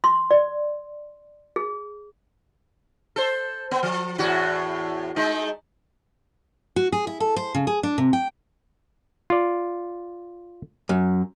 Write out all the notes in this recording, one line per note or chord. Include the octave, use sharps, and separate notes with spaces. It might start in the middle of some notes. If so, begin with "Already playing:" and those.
C6
D5
G#4
A4 C5
B3
F3
E2 A2 F#4
G#3 A3 D#4
F#4
G#4
E4
A4
C5
C#3
G#4
D4
C3
G5
F4 D5
F#2